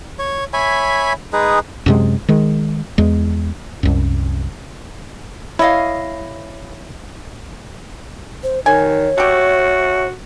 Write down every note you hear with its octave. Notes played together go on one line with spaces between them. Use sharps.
C#5
C#5 E5 G#5 B5
G#3 D#4 G#4 B4
F#2 C3 G#3
D#3 G#3
E2 G#3
C2 F#2
E4 C#5 D#5 F5
C5
D#3 C#5 G#5
A3 F#4 G4